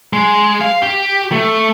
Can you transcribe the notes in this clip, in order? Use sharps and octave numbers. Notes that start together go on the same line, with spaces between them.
G#3
F5
G4
A3